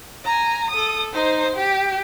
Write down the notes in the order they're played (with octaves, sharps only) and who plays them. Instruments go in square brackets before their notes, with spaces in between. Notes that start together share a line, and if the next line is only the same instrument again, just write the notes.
[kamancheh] G#5 A#5
A4 D#6
D#4 C5
G4